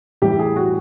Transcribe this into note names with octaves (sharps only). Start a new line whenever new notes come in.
A2 E3 G3 G4
G#4
F#4